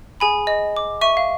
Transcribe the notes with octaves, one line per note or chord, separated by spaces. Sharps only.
G#4 G#5 B5
D#5
D6
E5 C#6 D#7
F5